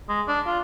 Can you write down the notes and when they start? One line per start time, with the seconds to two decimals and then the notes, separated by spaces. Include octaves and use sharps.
0.09 G#3
0.28 D4
0.46 F4